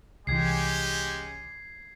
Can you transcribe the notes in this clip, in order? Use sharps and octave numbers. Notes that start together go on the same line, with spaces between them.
C2 E3 G#3 C#4 G4 G#6 C7